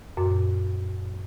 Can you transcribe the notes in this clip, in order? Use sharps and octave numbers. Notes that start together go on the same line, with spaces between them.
F#2 A#2